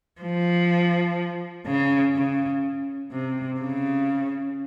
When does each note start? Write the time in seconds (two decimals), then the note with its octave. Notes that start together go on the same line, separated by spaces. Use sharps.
0.21 F3
1.66 C#3
2.15 C#3
3.12 C3
3.60 C#3